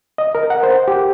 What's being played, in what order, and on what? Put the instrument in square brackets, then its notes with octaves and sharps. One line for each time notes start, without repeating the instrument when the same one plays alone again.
[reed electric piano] D#5
A#4
F#5
C5
G4